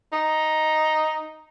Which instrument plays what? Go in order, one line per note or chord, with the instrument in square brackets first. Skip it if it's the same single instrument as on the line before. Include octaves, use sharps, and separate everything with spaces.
[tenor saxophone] D#4